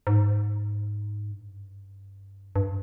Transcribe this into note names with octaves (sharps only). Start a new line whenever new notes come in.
G#2
G2
G2